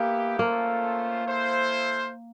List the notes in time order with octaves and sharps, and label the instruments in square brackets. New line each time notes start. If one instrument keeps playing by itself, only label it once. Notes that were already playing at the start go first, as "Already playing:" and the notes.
Already playing: [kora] A#3 [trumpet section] B3 E4 G4
[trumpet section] A3 C#4 F4 A4 C5 [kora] A#3
[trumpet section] E4 A4 C5 F5